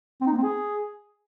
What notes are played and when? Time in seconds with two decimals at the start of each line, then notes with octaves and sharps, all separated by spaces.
0.21 C4
0.27 D#4
0.32 A#3
0.38 C4
0.43 G#4